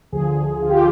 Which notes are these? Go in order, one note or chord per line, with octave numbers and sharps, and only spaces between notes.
D2 D3 F3 G#4
F4
G4
F4